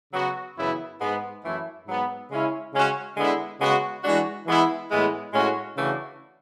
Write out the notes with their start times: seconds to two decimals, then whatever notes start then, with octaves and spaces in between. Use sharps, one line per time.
0.13 C#3 F#3 B3 F#4
0.57 F#2 C#3 E3 B3 E4
1.00 G#2 G#3 B3
1.44 F#2 E3 A3 E4
1.87 G#2 F#3 B3
2.30 C#3 G#3 C#4 E4
2.73 C#3 G#3 C#4 F#4
3.17 D3 G#3 B3 E4
3.60 C#3 G#3 B3 F#4
4.04 E3 G#3 D4 F#4
4.47 E3 G#3 B3 E4
4.90 A2 E3 G#3 B3
5.33 A2 G#3 C#4 F#4
5.77 C#3 E3 A3 D4 F#4